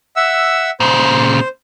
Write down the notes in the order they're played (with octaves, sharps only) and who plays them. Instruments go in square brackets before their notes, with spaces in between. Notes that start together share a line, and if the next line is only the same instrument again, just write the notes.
[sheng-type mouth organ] E5 F#5 E6
[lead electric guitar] A#2 C#3 [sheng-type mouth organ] C5